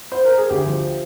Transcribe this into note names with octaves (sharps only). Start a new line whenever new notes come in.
C5
A#4
G#4
D2 G4
F3